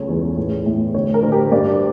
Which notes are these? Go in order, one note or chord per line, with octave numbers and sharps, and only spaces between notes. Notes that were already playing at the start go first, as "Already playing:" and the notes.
Already playing: C#2 G3 A3 C#5
E2
A2
A2
D2 C#5
A#4
D2
G4
G2 D5